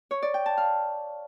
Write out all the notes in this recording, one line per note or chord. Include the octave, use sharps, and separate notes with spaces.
C#5
D5
G5
A5
F5